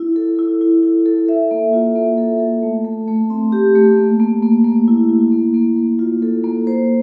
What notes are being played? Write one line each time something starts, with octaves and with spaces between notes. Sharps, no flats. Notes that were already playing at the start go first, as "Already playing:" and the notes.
Already playing: E4
A4
E4
E4
E4
A4
E5
A#3
F4
A#3
A4
A4
A3
A3
A3
C4
G4
A3
A#3
A#3
A#3
A#3
E4
E4
A#3
A#3
A#3
F4
A4
A#3
C5